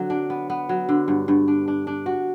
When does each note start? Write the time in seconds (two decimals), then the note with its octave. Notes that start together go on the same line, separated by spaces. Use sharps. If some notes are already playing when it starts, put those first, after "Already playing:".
Already playing: D3 F#3 C4
0.10 D4
0.30 B3
0.50 B3
0.69 F#3
0.89 D3
1.08 G2
1.28 G2
1.48 D4
1.68 D4
1.87 D4
2.06 F#4